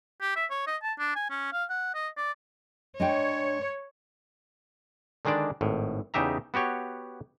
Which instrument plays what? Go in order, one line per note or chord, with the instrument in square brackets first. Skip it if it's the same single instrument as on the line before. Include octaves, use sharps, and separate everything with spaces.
[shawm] G4
E5
C#5
D#5
A5
D4
G#5
C#4
F5
F#5
D#5
D5
[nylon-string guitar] G#3 D4 G5 [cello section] C#5
[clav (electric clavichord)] D3 D#3 G#3 D4 D5
G#1 A2
E2 C#3 D#4 G4 E5 A#5
B3 F#4 G4 C#5